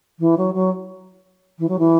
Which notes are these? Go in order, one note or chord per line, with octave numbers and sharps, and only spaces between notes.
E3
F#3
F#3
E3
F#3
E3